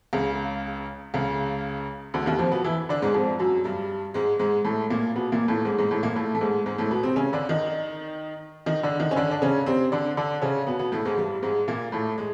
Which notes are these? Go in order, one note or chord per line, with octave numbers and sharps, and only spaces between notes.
C#2 C#3
C#2 C#3
D2 D3
D#2 D#3
F2 F3
B2 B3
E3 E4
D3 D4
G#2 G#3
F2 F3
F#2 F#3
G2 G3
G#2 G#3
G#2 G#3
A2 A3
A#2 A#3
B2 B3
A#2 A#3
A2 A3
G#2 G#3
G#2 G#3
A2 A3
A#2 A#3
A2 A3
A3
G#2 G#3
G#2 G#3
A2 A3
B2 B3
C3 C4
C#3 C#4
D3 D4
D#3 D#4
D#3 D#4
D3 D4
D#3 D#4
C#4
D3 D4
D4
C#3 C#4
C3 C4
D3 D4
D3 D4
C#3 C#4
B2 B3
B2 B3
A2 A3
G#2 G#3
G2 G3
G#2 G#3
A#2 A#3
A2 A3
G#3